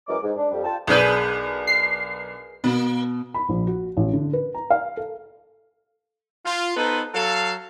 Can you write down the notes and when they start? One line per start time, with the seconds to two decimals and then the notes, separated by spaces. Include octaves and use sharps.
0.08 F#2 E3 G#3 A#4 D6
0.23 G#2
0.37 D4
0.51 F2 G3
0.65 F4 G5 A5
0.87 B1 D4 G#4 A#4 B4 G6
1.67 C7
2.64 B2 A#3
3.34 B5
3.49 A#1
3.67 F#4
3.97 A1
4.13 D3
4.33 B4
4.54 A#5
4.70 F5
4.97 A4
6.45 F4
6.76 B3 D#4 A4 B4 C5 D#5
7.15 F#3 A4 F5